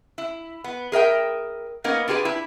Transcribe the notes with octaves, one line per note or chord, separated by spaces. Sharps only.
E4
B3
G#4 A#4 E5 G5
A#3 B3 C#4 D#4 A#4
D4 F4 G4 G#4 B4
E4